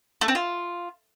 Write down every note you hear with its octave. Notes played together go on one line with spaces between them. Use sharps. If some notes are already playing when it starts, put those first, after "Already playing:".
A3
C4
F4